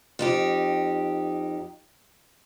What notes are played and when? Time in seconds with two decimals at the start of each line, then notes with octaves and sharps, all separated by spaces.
0.19 F2 D#4 G4